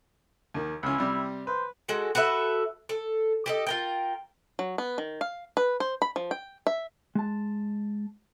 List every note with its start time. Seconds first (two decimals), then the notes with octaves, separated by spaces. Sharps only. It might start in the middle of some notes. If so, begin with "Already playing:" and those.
0.54 D#2 D#3
0.83 C#2 C#4 E4
0.98 C3 G3
1.47 B4 C5
1.88 G#3 F#4 A4
2.15 F#4 A4 B4 E5
2.89 A4
3.46 G4 A4 D#5
3.67 F4 A#4 G5
4.59 F#3
4.78 B3
4.98 D#3
5.21 F5
5.57 B4
5.80 C5
6.02 B5
6.16 F3
6.31 G5
6.67 E5
7.15 G#3 A5